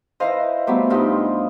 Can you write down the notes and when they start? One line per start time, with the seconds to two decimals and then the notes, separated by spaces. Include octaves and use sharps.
0.20 E4 B4 C5 D#5 F5 A#5
0.67 F#3 G3 A3 B3 C5 D6
0.90 G2 D#4 F4 D#5